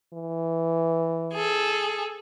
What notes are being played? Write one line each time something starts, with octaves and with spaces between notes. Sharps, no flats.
E3
G#4 A4